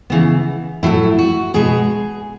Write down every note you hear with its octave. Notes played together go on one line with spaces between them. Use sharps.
C#3 E3 B3
A2 F#3 A3 E4
F#4
B2 G#3 B3 G#4